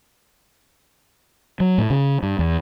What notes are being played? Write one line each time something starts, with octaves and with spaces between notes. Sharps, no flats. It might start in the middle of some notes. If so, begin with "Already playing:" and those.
F#3
A2
C#3
G2
E2